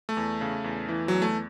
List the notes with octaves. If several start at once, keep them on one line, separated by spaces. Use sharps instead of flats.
A3
E2
C#3
E2
E3
E2 F#3
A3